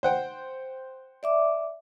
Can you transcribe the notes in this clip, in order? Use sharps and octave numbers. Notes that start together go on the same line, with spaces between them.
C5 F#5 G5
D5 E5 D6